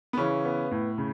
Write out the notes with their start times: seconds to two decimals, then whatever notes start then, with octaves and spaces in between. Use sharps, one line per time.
0.13 B3
0.17 C#3 E3 C#4
0.45 B3
0.71 A2
0.98 C#3